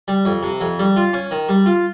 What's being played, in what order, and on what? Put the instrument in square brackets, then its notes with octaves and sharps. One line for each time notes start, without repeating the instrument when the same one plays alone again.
[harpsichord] G3
F2
C3
F2
G3
F4
C#4
D#3
G3
F4